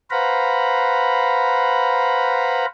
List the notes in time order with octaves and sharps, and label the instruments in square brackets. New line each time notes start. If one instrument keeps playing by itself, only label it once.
[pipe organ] B4 C5 F5 F#5 A#5 B5